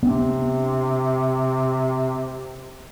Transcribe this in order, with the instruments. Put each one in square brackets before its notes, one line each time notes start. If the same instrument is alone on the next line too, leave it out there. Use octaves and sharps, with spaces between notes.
[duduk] C3 [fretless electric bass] B3 D4